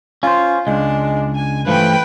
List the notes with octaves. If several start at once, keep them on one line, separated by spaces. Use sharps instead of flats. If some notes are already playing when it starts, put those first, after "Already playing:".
C#4 F4 C5
C#2 G#3 D4
G#5
G2 E3 F3 A3 B4 G5